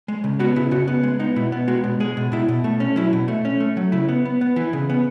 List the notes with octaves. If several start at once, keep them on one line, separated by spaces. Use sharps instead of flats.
G#3
C#3
B3 F#4
C#3 E4
C#3 F#4
B3
G#3
B3 D#4
B2 E4
B3
G#3 F#4
B2
G#3 G#4
B2
B2 E4
B2
A3
C#4
F#3 E4
B2
A3
C#4
A3
F#3
C#3 E4
B3
B3
B3
E3 E4
C#3
B3